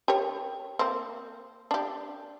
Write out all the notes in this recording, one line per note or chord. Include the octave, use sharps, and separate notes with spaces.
G4 A#4 C#5
A#3 C4
D4 G4